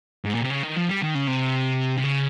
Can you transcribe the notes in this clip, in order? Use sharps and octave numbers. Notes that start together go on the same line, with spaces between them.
G#2
A#2
C3
C#3
D#3
F3
G3
D#3
C#3
C3
C3
C#3